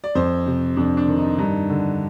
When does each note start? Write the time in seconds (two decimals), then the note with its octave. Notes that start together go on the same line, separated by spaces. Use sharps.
0.04 D5
0.15 F2 C5
0.46 C3
0.77 F2 D4
0.97 D4
1.08 D#3
1.18 D#4
1.38 G2 D#4
1.70 D3